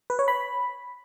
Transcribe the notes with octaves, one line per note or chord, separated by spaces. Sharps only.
B4
C#5
B5